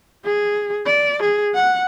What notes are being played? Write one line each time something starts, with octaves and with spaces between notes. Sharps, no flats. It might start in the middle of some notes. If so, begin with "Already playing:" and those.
G#4
D5
G#4
F#5